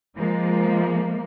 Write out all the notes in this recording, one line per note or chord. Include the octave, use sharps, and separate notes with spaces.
F3 G#3 A#3